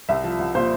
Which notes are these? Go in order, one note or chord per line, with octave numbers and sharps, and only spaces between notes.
C2 E5
F3
C2
A#2 C5